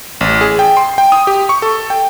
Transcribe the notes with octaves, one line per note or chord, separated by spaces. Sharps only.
A1
G#4
G5
C6
G5
D#6
G4
C#6
A4
G5